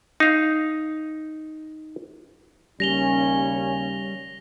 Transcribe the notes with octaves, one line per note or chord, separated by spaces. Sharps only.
D#4 F5
D#2 C#3 G3 C#4 A#6 F7 G7